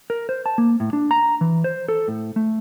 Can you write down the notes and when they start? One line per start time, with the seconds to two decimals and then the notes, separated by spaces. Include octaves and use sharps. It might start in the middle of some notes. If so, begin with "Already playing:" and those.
0.10 A#4
0.29 C5
0.46 A5
0.58 A#3
0.80 A2
0.93 D4
1.11 A#5
1.41 E3
1.64 C5
1.89 A4
2.08 A2
2.36 A3